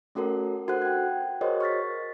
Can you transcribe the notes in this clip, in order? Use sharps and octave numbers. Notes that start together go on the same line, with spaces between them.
A3 C#4 F#4 A4 A#4
D4 F#4 A4 C5 F#5 F#6
G5 G#6
F#4 G#4 A#4 C5 C#5 D#5
C#6 F6 A6 B6